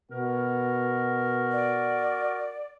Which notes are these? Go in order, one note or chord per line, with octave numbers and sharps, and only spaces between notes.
B2 F#4 A#4
D5